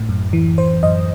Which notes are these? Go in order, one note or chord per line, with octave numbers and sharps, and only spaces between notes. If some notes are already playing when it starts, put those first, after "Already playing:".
Already playing: A2
F#2
E3
E3 C5
F#2 D#5